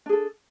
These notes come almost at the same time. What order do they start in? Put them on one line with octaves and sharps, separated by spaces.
D4 G#4 A4